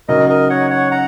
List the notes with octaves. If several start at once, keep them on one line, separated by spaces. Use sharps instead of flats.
F#2 C#3 F#3 D#4 A#4 D#5
A#4 D#5
C#5 F#5
C#5 F#5
F#5 A#5